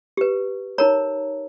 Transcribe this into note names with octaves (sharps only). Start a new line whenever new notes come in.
G4 B4
D#4 A#4 C#5 A#5